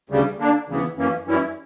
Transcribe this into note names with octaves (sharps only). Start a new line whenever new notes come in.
D2 C#3 G3
D3 A#3 D4
D2 C#3 E3 B3
F#2 E3 A#3 C#4
F#2 E3 G3 C#4 E4